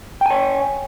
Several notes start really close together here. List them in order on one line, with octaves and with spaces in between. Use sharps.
G5 G#5 C#5